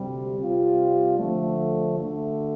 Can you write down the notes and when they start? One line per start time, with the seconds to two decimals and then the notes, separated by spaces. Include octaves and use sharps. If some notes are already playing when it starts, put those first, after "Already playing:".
Already playing: D2 C3 G3
0.37 C3 G3 C4 F4
1.17 D3 F3 A3
1.98 D2 D3 A3